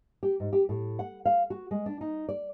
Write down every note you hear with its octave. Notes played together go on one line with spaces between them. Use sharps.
G4
G#2
G4
A2
F#5
F5
F#4
G#3
D4
D#4
D5